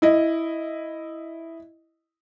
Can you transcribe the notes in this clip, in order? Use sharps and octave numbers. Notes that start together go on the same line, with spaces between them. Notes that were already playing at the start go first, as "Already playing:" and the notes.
E4 D#5